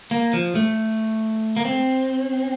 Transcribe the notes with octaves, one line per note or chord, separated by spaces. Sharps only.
A#3
F3
A3
A#3
C4